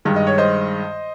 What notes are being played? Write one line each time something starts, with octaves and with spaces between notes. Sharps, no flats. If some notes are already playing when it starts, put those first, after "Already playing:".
G2 D#3 G#3
D#5
C#5
C5 D#5